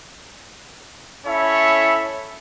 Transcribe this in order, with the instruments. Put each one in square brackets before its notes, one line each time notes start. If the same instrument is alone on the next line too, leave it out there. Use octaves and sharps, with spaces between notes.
[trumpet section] C#4 E4 A4 C#5 E5 B5